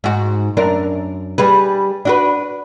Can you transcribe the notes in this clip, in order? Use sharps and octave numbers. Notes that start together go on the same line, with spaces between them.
G#2 F#4
F#2 D4 A#4
G3 G#4 B4
D4 F#4 B4